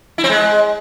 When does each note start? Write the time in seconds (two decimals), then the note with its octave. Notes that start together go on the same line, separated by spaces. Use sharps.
0.18 E4
0.24 C4
0.30 G#3